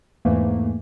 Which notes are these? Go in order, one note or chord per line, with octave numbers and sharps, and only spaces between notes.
E2 G#2 E3 A3 A#3